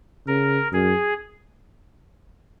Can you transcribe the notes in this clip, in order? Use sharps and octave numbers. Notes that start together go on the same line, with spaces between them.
C#3 A#4
F#2 G#4